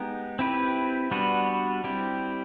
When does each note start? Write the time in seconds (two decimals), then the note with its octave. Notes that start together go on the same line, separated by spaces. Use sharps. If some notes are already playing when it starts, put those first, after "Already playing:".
Already playing: G#3 B3 D#4 G4
0.39 C4 E4 G4 B4
1.11 G3 B3 D4 F#4 B4
1.84 G3 C4 E4 G4